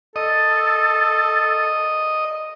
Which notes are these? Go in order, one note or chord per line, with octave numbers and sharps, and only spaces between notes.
A4 D#5